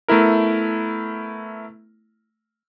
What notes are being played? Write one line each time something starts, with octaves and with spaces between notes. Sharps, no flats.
A3 B3 E4 A#4